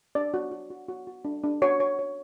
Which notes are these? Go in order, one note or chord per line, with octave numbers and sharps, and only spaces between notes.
D4 D5
F#4
F#4
F#4
F#4
F#4
D4
D4
F#4 C#5
C#5
C#5